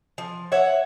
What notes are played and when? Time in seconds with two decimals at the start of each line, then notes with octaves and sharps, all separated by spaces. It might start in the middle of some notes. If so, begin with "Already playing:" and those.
0.18 F3
0.52 C#5 E5 F#5